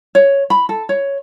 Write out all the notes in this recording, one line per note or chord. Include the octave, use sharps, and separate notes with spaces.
C#5
B5
A4
C#5